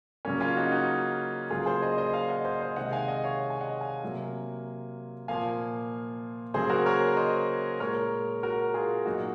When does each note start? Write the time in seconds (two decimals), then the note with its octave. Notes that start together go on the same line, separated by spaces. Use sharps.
0.25 C#3 F#3 A#3 C#4
0.40 C#4 F4
0.57 D#4 F#4
0.71 D#4 F#4
1.50 C#3 F#3 A#3 F4 G#4
1.66 G#4 C5
1.82 C5 D#5
1.98 C5 D#5
2.13 F5 G#5
2.29 D#5 F#5
2.45 C5 D#5
2.61 C5 D#5
2.76 C3 D#3 G#3 D#5 F#5
2.92 F5 G#5
3.08 D#5 F#5
3.24 C#5 F5
3.50 G#5
3.60 D#5 F#5
3.81 F5 G#5
4.03 C3 F#3 A#3
5.28 A#2 F3 A#3 F5 G#5
6.54 C#3 F#3 A#3 G#4 C5
6.70 F#4 A#4
6.86 A#4 C#5
7.17 C5 D#5
7.80 A#2 G#3 A#4 C#5
8.43 F#4 A#4
8.74 F4 G#4
9.05 A#2 F#3 A#3 D#4 F#4
9.18 F#4